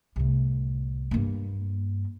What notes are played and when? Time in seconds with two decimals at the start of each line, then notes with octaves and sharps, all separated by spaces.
0.16 C2 A2
1.11 G2 A#3